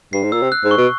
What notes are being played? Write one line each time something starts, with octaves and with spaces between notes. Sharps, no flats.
G2 C7
G#2
A#2 E6
C3
F#6
G#2
C#6
B2